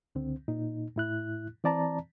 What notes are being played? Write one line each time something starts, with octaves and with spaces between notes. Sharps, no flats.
C#2 D3 C4
A#2 D#4
A2 E4 F#6
E3 C4 D5 A5 A#5